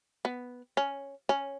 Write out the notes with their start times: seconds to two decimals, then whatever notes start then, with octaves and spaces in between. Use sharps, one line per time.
0.25 B3
0.77 C#4
1.29 C#4